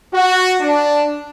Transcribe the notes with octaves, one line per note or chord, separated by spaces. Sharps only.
F#4
D4